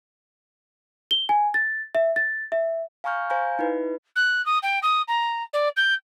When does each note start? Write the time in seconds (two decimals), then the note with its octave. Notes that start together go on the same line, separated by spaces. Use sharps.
1.11 G7
1.29 G#5
1.54 A6
1.95 E5
2.16 A6
2.52 E5
3.04 F5 G#5 A#5 C#6 F6 G6
3.30 C5 F5 G#5 A#5 G6
3.59 D#4 E4 B4
4.16 F#6
4.46 D#6
4.63 G5
4.83 D#6
5.08 A#5
5.53 D5
5.76 G6